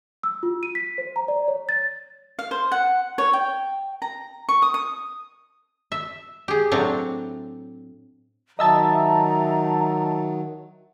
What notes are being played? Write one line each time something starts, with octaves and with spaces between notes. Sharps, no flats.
E6
F4
D#7
B6
C5
A#5
D5
C#5
A6
F5
C5
F#5
C#5
G5
A#5
C#6
D#6
D#6
E5
G4 G#4
A2 F#3 C4 D4 A#5
D#3 F#3 D#5 E5 A5 A#5